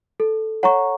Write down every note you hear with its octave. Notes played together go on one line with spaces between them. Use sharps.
A4
C#5 F#5 A#5 C#6